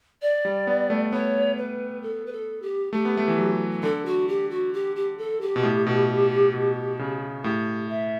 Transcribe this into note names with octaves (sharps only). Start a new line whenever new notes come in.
D5
G3
B3
A3
B3 C#5
B4
A4
B4
A4
G4
A3 G4
B3
A3
E3
F#3
D3 A4
F#4
G4
F#4
G4
G4
A4
G4
B2
A2
B2
B2
C#3
A2 G4
E5